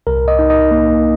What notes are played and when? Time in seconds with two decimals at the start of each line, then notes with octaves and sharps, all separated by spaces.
0.07 C2 A#4
0.28 D#5
0.39 D#4
0.50 D#5
0.71 A#3